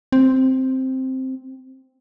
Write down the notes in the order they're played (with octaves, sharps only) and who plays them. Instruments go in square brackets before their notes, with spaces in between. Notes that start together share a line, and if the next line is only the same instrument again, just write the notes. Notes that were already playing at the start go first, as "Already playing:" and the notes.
[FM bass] C4